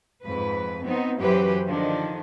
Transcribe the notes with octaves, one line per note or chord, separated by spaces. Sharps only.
F2 G#2 B4
B3 C4 D#4
F#2 E3 F#3 G4 B4 C5
D3 D#3 F3 D4 D#4